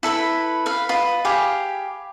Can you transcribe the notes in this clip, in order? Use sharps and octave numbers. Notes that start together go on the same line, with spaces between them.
E4 A4 B4 B5
B4 F5
F4 B4 D#5
G4 G#4 F5 B5